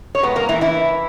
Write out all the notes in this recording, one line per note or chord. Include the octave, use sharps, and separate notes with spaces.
C#5
A#2 G#3 B3 B4
A#3 A#4
E3 E4
E3 E4